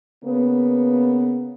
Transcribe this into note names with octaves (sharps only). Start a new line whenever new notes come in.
C#3 A#3 B3